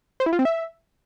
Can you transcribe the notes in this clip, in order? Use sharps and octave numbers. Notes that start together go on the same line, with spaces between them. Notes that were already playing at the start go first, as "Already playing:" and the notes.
C5
E4
F4
C4
E5